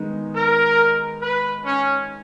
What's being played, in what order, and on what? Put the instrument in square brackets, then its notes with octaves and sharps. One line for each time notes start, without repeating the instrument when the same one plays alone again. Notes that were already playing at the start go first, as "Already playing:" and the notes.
Already playing: [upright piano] D#3 G#3 B3 D#4
[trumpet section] A#4
B4
C#4